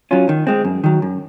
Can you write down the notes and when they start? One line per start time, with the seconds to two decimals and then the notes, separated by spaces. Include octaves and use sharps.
0.11 F#3 C#4 F4
0.29 D#3
0.47 G#3 C4
0.65 F#2
0.84 D#3 F#3
1.02 F#2